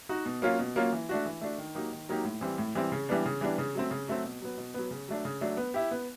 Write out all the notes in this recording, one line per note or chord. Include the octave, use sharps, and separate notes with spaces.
D#4 F#4
B2
F#3 A#3 C#4 F4
B2
F#3 A#3 C#4 F4
E3
A3 D4 F#4
E3
A3 D4 F#4
D#3
F#3 A#3 D#4 G4
D#3
F#3 A#3 D#4 G4
A2
E3 G3 C4
A2
E3 G3 C4
C#3
E3 G3 B3 D4
C#3
E3 G3 B3 D4
C#3
F#3 A3 C4
C#3
F#3 A3 C4
B2
F#3 B3
B2
F#3 B3
C#3
F#3 A3 D4
C#3
F#3 A3 D4
B3
E4 G4
B3